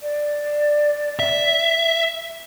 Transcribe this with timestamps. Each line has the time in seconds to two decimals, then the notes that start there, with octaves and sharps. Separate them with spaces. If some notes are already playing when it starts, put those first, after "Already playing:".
0.02 D5
1.19 E5